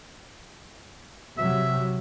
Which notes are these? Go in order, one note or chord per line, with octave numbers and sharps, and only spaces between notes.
C3 F#3 E5